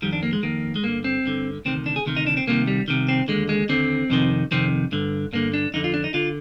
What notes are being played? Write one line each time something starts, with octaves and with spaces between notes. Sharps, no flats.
F2 D#3 G3
D4
A#3
G#3
F2 D#3 A#3
G#3
G2 D3 A#3
C4
G2 D3
D2 C3 D#3 C4
D4
G#4
D2 C3 D#3
D#4
D4
C4
C2 C3 D#3 A#3
G3
C2 C3 D#3
C4
D#2 D3 G#3
G#3
D#2 D3 C4
F2 C3 D#3
F2 C3 D#3 C4
G2 D3
G2 D3 A#3
D4
F2 D3 D#4
F4
D4
D#4
D3 F4